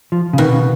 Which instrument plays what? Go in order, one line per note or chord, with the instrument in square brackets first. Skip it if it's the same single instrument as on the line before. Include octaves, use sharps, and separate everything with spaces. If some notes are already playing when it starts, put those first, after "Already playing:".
[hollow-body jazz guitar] F3
C#3
[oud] B2 [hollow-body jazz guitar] D#3
[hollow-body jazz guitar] C#3